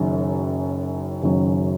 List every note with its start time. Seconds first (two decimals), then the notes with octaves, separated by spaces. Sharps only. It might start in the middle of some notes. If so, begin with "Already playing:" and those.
Already playing: F#1 F#2 D#3
1.23 F#1 F#2 D#3 F#3